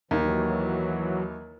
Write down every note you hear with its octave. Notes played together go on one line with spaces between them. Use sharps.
D#2 E3 F#3